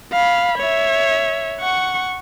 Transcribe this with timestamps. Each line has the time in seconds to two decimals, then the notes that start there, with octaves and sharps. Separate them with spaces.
0.12 F5 B5
0.58 C#5 E5
1.60 F#5 C#6